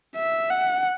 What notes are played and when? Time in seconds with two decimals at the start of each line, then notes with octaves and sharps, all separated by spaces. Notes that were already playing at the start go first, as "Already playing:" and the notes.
0.16 E5
0.50 F#5